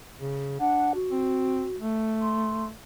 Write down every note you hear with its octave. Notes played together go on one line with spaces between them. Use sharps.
C#3
D4 F#5
F#4
C4
A3
C6